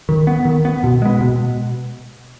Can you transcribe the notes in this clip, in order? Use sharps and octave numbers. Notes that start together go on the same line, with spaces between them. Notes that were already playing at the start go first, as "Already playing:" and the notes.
D#3
B3
D#3
B3
B2
G#3 B3
B2